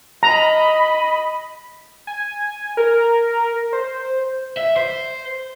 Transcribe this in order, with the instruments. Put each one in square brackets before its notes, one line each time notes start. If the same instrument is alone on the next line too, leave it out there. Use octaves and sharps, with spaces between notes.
[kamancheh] D#5 B5 [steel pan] A#5
[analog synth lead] G#5
A#4
C5
[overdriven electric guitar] E5
C5